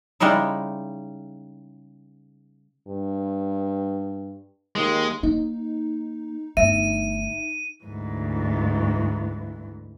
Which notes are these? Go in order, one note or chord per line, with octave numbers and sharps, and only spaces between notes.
C#3 G3 G#3 D#4 E4
G2
D#2 G#3
A#3 D#4
G1 A3 E5 D#7
D2 G#2 E3